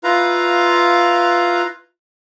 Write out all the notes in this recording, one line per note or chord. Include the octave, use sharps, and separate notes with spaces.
E4 F4 B4 F5 A#5